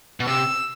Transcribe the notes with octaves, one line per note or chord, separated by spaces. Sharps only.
B2
C3 E6